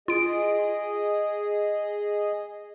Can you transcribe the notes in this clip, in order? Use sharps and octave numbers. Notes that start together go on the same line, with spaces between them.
F4 G#4 D#5 D7